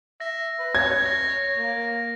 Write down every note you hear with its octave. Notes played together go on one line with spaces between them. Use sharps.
E5 A#6
B4
C#5 G#6
A#6
A#3